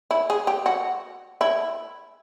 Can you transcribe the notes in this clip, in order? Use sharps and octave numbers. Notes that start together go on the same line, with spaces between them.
E4
G#4
G4
F#4
E4